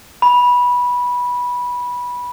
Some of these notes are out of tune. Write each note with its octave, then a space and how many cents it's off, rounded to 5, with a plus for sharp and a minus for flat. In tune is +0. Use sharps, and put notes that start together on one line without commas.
B5 -15